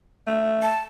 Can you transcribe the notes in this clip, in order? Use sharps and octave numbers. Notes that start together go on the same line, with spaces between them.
A3
A5